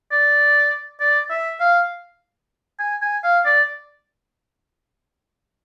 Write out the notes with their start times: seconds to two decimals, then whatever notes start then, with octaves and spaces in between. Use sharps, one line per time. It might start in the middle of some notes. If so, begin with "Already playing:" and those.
0.11 D5
1.00 D5
1.30 E5
1.60 F5
2.79 G#5
3.01 G#5
3.24 F5
3.45 D5